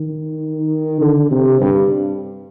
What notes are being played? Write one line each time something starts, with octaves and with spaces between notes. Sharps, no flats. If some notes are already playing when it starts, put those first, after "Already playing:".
Already playing: D#3
D3
C3
G2